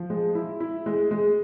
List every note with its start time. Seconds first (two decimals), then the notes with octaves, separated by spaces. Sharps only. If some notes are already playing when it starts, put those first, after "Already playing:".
Already playing: F3
0.10 G#3
0.35 E4
0.60 E4
0.86 G#3
1.11 G#3